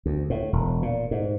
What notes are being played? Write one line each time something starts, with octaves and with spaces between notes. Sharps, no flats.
D2
A2
E1
A#2
G#2